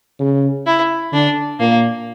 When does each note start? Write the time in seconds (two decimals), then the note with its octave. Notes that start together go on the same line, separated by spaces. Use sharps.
0.19 C#3
0.66 E4
1.12 D3 D4
1.60 A#2 A#3